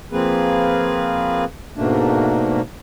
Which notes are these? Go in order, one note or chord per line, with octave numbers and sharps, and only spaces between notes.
F3 A#3 C4 G#4 B4
G#2 B2 A3 A#3 D4